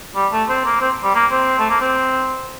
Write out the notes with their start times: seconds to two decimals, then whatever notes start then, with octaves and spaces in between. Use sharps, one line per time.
0.15 G3
0.32 A3
0.49 C4
0.65 A#3
0.81 C4
1.04 G3
1.14 A#3
1.31 C4
1.59 A3
1.70 A#3
1.81 C4